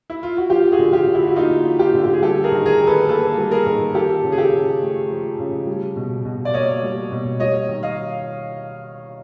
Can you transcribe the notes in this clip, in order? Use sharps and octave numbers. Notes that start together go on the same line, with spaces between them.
E4
F4
F#4
F3 F4 G4
F#4 G#4
D3
F4 G4
D3
E4 F#4
F#4
A#3 D#4 F4
F3
F4 G4
D3
G4
G#4
G3 G4 A4
G#4 A#4
D#3
G#4 A#4
D#3
A4 B4
A#3 A4 B4
G3
G#4 A#4
D#3
F3 G4 A4
C#3
G#4
G4 A4
C#3
A3
F3
C#3
G3
B2
B2
D5
A#3 C#5 D#5
G3
B2
G3 C#5 D#5
D#3
D#5 F5